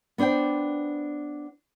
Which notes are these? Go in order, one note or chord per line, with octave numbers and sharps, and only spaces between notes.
B3 D4 C5 D5 G5